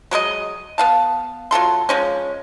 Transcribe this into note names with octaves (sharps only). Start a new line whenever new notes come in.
F#3 G#3 A#4 D#5
B3 F5 A5
F#3 F4 A4 C6
F3 G#3 C#4